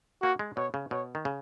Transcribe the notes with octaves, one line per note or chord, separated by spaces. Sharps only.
A#3 F#4
G#3
B2 C#5
C#3
B2 C#5
D#3
C#3